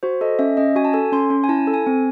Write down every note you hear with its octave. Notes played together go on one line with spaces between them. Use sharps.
F#4 C5
A4 D#5
C#4 E5
C#4 D#5
F#4 G#5
A5
A4 G#5
C#4 C6
C#4
G#5
E4 A5
A4
G#5
C4